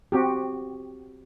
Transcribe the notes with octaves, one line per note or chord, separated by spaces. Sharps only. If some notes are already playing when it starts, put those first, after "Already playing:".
C4 F#4 G4